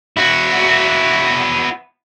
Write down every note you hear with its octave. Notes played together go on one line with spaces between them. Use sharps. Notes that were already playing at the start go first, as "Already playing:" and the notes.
E4 F#4